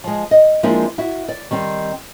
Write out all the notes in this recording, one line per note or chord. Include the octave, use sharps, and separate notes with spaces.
F3 G#3
D#5
F3 G#3 A#3 C4 D4 E4
E4 F#4
D5
D#3 G3 C4